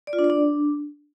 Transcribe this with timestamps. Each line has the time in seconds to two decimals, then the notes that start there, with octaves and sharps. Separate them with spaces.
0.07 D5
0.13 F4
0.19 D4
0.24 D5
0.30 D4